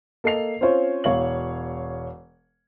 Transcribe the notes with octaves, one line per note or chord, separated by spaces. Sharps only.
A#3 A4 D#5 C7 F7
C4 C#4 F4 C5 C#5
E1 C#5 F5 F#7